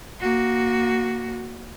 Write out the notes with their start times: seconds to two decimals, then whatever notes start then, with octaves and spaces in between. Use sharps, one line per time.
0.20 A#3 F#4